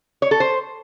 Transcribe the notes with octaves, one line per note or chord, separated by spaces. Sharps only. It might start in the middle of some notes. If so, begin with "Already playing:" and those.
C#5
A4
C5